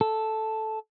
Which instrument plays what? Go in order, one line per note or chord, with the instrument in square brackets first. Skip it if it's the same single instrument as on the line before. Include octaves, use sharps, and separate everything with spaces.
[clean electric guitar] A4